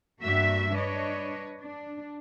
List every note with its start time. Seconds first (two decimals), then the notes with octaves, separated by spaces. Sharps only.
0.22 G2 G3 A#3 F#4 E5
0.74 D4 B4 C#5 D#5
1.60 D4